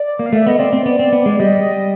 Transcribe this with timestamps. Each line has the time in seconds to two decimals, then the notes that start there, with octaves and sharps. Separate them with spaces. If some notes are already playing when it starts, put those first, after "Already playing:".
Already playing: D5
0.19 A#3
0.26 F5
0.33 A3 E5
0.47 B3 D#5
0.59 C4 D5
0.73 C4
0.86 B3
0.99 C4
1.12 B3
1.26 G#3
1.39 G3 D#5